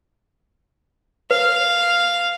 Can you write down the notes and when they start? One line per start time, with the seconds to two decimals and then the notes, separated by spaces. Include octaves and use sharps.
1.31 B4 F5